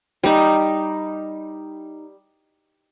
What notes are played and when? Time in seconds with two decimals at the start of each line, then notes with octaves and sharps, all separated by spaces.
0.23 G3 D#4